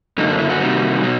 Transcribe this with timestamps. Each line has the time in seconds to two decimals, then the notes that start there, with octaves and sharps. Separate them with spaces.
0.18 F#2 D3 F#3 A#3 D#4
0.28 D4
0.39 E4
0.50 F#4
0.60 C3 D#3 G3 A#3
1.03 B2 F#3